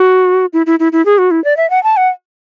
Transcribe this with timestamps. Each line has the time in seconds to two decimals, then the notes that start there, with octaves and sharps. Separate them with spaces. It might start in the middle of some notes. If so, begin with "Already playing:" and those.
Already playing: F#4
0.53 E4
0.66 E4
0.80 E4
0.92 E4
1.06 G#4
1.18 F#4
1.31 E4
1.44 D5
1.57 E5
1.70 F#5
1.83 A5
1.97 F#5